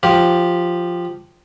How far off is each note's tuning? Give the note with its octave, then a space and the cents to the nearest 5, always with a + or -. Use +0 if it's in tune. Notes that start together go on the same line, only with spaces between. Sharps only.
F3 +0 G4 +0